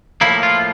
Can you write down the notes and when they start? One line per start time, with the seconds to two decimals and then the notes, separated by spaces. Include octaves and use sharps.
0.21 A2 F3 A#3 E4
0.43 F4